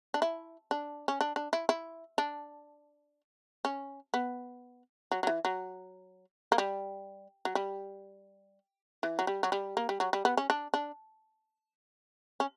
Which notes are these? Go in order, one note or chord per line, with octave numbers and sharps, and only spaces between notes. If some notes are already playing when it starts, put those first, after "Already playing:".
D4
E4
D4
C#4
D4
D4
E4
E4
D4
C#4
B3
F#3
F#3
E3
F#3
A#3
G3
F#3
G3
E3
F#3
G3
F#3
G3
A#3
G3
F#3
G3
B3
C#4
D4
D4
C#4